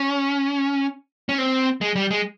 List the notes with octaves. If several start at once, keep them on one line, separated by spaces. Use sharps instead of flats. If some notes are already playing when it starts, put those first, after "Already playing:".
Already playing: C#4
C#4
C4
G#3
G3
G#3